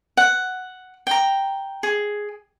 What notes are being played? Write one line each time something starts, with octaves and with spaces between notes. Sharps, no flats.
F#5
G5 A#5
G#4